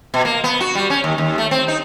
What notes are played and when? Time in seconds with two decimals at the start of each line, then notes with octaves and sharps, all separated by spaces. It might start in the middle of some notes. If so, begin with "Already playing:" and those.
0.14 B2
0.25 A#3
0.44 B3
0.60 F#4
0.75 G3
0.90 C#4
1.04 D#2
1.18 D#2
1.38 A3
1.51 C4
1.68 D#4